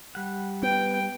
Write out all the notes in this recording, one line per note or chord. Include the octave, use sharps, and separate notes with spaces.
G3 F#5
B3 G5